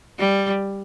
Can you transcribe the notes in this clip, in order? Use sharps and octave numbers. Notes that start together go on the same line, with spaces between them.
G3